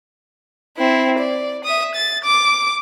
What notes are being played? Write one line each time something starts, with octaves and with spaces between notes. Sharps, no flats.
C4 E4
D5
E5 D#6
A6
D6